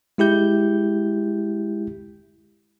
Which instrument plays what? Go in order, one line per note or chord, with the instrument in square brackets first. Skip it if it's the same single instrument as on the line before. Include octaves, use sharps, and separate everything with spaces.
[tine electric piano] G#3 E4 G4 G6